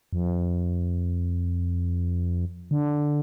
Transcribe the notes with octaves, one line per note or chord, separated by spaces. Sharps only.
F2
D3